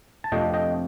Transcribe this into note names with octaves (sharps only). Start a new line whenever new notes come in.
A5
F2 C3 F3 A3 D4 D#5 G5
D#5 G5